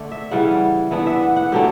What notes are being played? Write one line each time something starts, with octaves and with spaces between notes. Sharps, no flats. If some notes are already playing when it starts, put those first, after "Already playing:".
Already playing: D3 A3 D4
E5
C#3 E3 G3 F#5
E3 B3 D4 F#5
E5
F#5
F#5
D3 F#3 A3 D4 G4